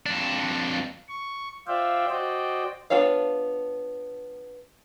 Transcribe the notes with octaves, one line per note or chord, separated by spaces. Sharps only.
F2 D4
C#6
F4 C5 D5 E5 F5 G5
F#4 C5 D5 D#5 G5
B3 D4 F4 C#5 F5